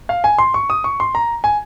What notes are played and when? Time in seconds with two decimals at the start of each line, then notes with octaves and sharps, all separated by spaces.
0.09 F5
0.24 G#5
0.38 C6
0.54 C#6
0.70 D#6
0.84 C#6
1.00 C6
1.15 A#5
1.44 G#5